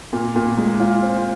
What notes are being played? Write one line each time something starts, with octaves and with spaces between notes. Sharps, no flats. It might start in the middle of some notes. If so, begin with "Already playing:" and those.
A#2
A#2
G#3
F4
C4